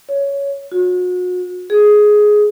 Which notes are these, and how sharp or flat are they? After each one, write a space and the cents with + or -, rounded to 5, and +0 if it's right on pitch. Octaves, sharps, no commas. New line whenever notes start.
C#5 +10
F#4 -35
G#4 +10